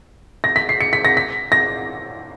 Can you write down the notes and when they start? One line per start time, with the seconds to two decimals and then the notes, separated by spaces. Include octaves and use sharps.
0.44 A#6
0.56 B6
0.69 C7
0.81 C#7
0.93 B6
1.05 A#6
1.17 B6
1.52 A#6